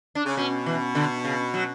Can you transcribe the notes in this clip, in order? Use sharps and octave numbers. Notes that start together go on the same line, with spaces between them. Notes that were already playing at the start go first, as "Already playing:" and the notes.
D4
C#3
B2 C#4
E3
D3
C#3
F#3